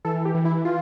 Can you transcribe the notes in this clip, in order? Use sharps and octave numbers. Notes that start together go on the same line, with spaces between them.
E3 A4
G4
E3
E4
E3 F4